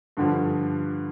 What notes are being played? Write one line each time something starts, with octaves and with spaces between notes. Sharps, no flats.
G2 D3 F3